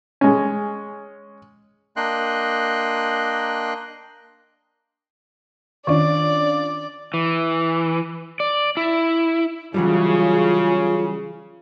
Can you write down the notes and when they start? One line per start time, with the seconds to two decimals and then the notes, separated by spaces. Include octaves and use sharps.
0.21 G#3 C#4
1.96 A#3 D4 D#5 G5 C6 F#6
5.87 D#3 C#4 D4 F4 D5
7.14 E3
8.40 D5
8.77 E4
9.74 C#3 E3 F#3 G3 F4